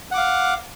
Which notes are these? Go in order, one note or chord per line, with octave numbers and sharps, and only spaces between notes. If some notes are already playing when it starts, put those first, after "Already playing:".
F5 F#5 D6